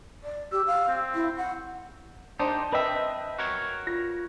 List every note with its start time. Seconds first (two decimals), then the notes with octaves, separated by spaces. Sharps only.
0.24 D5
0.52 G4 E6
0.67 F5
0.88 C4
1.15 E4
1.37 F#5
2.39 D4 D#4 G4 C5 A5
2.72 C4 B4 D#5 E5 G5
3.39 F#4 A#4 C#5
3.87 F4 A#6